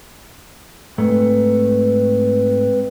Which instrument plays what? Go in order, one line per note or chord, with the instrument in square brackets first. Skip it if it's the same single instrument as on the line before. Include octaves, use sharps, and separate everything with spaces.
[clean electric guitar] G#2 A3 [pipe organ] G#3 C4 B4